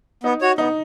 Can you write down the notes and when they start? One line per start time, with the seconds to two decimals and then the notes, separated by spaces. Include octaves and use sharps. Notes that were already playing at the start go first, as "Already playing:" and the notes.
0.23 B3 D#4
0.41 F#4 C#5
0.58 B3 D#4